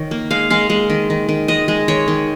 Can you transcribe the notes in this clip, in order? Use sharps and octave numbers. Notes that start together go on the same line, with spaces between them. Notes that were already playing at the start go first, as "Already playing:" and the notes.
Already playing: D#3 C#5
A#3
G#3 F5
G#3 F5
G#3
D#3
D#3
D#3
G#3 D#5
G#3
D#3 C#5
D#3